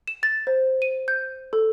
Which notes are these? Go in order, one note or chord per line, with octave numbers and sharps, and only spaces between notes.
E7
A6
C5
D#7
G6
A4